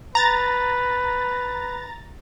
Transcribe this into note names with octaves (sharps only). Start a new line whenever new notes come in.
B4 A#5 A6